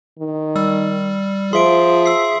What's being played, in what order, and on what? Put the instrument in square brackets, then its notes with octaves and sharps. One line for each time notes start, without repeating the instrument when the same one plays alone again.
[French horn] D#3
[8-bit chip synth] G3 [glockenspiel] E6
[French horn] F3 [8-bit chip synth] G#4 E5 [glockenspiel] C6 D7
[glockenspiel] E6 C7